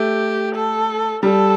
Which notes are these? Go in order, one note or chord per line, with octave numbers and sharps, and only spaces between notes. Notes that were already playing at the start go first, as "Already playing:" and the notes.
Already playing: A3 G4
A4
G3 A4